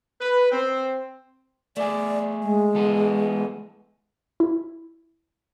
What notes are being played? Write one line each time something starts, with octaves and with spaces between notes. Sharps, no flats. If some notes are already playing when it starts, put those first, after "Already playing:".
B4
C4
A3 G#4 D5
G#3
E3 B3 A4
E4